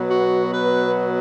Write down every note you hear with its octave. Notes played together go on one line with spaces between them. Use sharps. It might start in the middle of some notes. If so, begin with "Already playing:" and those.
Already playing: B2 F#3 B3
F#4
B4